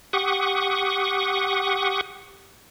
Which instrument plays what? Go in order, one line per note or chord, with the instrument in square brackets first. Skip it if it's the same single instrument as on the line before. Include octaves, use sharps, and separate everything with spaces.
[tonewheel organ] G4 F#5 C#6 D#6